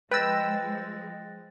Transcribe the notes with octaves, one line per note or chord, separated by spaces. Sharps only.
F3 G#3 B4 G5 E6 F#6 A6 A#6